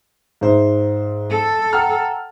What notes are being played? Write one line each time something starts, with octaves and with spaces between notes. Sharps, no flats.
G#2 C5 E5
A4
F#5 G5 A#5 F6